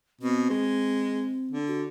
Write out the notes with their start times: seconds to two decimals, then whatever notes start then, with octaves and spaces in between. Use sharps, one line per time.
0.21 B2 C4
0.50 G#3
1.51 D3
1.68 F#4